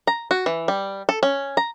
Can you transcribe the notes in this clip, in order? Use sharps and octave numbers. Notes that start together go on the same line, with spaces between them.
A#5
F#4
E3
G3
A4
C#4
A#5